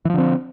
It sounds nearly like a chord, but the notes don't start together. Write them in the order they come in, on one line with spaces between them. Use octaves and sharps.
E3 F3 D3 C4